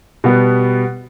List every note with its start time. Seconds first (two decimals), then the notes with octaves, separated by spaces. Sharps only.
0.24 B2 G3 B3